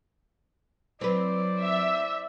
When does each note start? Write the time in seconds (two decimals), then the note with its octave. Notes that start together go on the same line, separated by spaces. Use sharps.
1.01 F#3 C4 E4 B4 C5 D5
1.60 E5